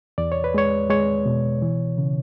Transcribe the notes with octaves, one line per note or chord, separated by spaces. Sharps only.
E2 D5
C#5
B4
G#3 C#5
G#3 C#5
B2
E3
C#3